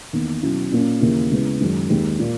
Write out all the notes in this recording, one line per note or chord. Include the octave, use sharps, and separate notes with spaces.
E2 D#3 A#3 D#4
B2 F#3 C#4 E4
A#2 A#3 C#4
D#2 C#3 E3 A#3 E4
C#3 G#3 B3 E4
F#2 D#3 G#3 D#4
D#2 D#3 G#3
A#2 A#3